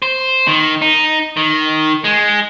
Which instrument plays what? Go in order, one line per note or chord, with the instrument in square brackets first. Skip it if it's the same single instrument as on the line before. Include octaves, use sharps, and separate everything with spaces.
[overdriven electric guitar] C5
D#3
D#4
D#3
G#3